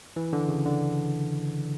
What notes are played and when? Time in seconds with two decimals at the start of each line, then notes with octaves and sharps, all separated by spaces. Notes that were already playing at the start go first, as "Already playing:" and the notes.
0.16 E3
0.33 D3
0.48 C#3
0.65 D3